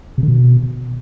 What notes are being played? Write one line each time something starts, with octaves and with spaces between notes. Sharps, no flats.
C3
D3
B2